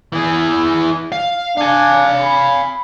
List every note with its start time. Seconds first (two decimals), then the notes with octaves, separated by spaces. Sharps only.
0.13 E3 G#4
1.12 F5
1.57 D4 F5 G#5
2.20 B5